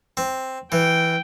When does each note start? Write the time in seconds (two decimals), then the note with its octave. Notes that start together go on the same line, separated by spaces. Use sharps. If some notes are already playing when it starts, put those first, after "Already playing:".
0.17 C4
0.72 E3 G5